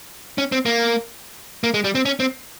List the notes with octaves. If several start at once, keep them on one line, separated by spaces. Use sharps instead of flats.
C#4
C4
A#3
A#3
G#3
G3
C4
C#4
C4